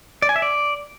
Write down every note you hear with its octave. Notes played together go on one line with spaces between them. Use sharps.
D5
G#5
E5
D5